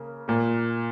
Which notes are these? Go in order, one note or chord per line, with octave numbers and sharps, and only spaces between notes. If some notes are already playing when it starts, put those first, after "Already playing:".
Already playing: C#3 A#3
A#2 A#3